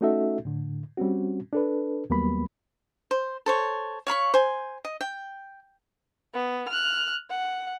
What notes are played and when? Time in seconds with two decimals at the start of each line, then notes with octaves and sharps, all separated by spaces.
0.01 A3 C#4 D#4 F#4 A4 E5
0.45 A2 D3
0.97 G3 C4 C#4 F#4
1.53 D4 A4 B4
2.10 D#2 F#3 G3 A#3 B3 B5
3.11 C5
3.46 A4 C5 C#5
4.07 C#5 F5 B5 C#6
4.34 C5 G#5
4.85 D#5
5.01 G5
6.34 B3
6.69 F6 F#6
7.30 F#5